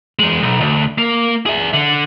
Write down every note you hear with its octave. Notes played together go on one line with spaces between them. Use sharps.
E2 G#3
B1
D2
A#3
G#4 E5
D3